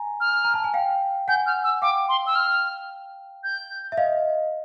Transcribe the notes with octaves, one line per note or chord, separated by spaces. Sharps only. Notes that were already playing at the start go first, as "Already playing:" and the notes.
Already playing: G#5 A#5
F6
A#5
A5
G#5
F5 G5
F#5 G#5 G6
F6
E6
F5 G5 D6
C6
E6
F6
G6
E5
D#5 F5